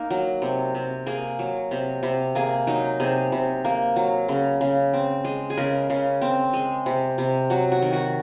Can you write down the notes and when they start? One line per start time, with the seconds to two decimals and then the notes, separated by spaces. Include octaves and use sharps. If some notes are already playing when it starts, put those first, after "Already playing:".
Already playing: A#3 D#4 A#4
0.10 F#3
0.42 C3
0.74 C3
1.06 A#3 G#4
1.39 F#3
1.71 C3
2.03 C3
2.35 A#3 G#4
2.67 F#3 D#4
3.00 C3 G#4
3.32 C3
3.65 A#3
3.96 F#3
4.28 C#3
4.61 C#3
4.93 C4
5.24 G#3
5.50 G#4
5.57 C#3 A#4
5.90 C#3
6.22 C4
6.53 G#3
6.86 C3
7.18 C3
7.50 F#3 F#4
7.72 F#4
7.82 D#3
7.93 F#4